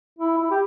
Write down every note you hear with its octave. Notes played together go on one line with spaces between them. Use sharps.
E4
E4
G4